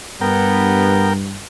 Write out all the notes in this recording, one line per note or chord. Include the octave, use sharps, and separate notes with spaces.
G2 B3 A#4 G5